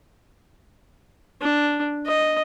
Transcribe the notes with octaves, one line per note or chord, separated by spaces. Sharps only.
D4
D#5